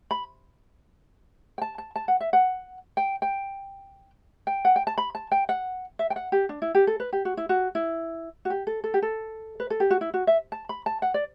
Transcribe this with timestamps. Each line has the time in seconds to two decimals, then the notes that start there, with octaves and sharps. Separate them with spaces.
0.11 B5
1.58 G5
1.62 A5
1.78 A5
1.96 A5
2.08 F#5
2.21 E5
2.33 F#5
2.97 G5
3.22 G5
4.47 G5
4.65 F#5
4.76 G5
4.87 A5
4.98 B5
5.15 A5
5.32 G5
5.49 F#5
5.99 E5
6.10 G5
6.16 F#5
6.32 G4
6.49 D4
6.62 E4
6.75 G4
6.87 A4
7.00 B4
7.13 G4
7.25 F#4
7.37 E4
7.49 F#4
7.75 E4
8.45 F#4
8.50 G4
8.67 A4
8.84 A4
8.94 G4
9.02 A4
9.60 B4
9.70 A4
9.80 G4
9.91 F#4
10.01 E4
10.14 F#4
10.27 E5
10.52 A5
10.69 B5
10.86 A5
11.02 F#5
11.14 D5